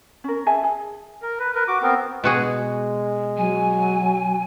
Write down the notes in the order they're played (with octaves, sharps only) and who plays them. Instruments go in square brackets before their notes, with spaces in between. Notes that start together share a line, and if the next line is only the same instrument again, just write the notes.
[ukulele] C#4 A#4
G#4 E5 G#5 A5
G#4
[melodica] A#4
B4
A#4 B4
F#4 D6
B3 C4 A#4
[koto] B2 F#4 G#4 [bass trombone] G#3
[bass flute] F#3 [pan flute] G#5